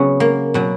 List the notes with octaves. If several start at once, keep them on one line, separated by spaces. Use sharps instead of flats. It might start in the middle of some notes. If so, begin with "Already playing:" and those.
Already playing: C#3 F#3 B3 C#4
A#3
B2 F#3